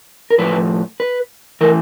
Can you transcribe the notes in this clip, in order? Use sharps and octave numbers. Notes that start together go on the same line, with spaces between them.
A#4
A2 F3 A3 B4
B4
E3 A3 A#4